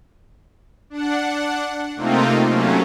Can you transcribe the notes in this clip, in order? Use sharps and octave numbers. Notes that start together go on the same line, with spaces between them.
D4 F#5
C3 A3 A#3 C4 D#4 F4
C3 F#3 A3 A#3 C#4